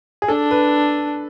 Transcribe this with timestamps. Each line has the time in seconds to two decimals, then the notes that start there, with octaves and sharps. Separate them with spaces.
0.22 G#4
0.28 D4 A4
0.51 B4